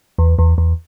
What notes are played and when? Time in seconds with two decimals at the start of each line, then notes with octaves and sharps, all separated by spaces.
0.18 E2
0.39 E2
0.58 E2